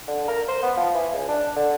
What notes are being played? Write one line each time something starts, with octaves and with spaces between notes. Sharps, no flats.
D3
A#4
C5
B3
F3
E3
C#2
D4
D3